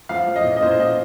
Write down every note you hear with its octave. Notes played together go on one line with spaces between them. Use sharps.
F3 F5
F3
D#5
A#2
D#5
A#2 C5
A#2 D#5